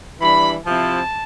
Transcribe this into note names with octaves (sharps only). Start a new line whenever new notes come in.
E3 G3 D4 B5
C3 F3 C4 E4 A5